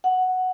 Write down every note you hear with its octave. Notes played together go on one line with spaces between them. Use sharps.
F#5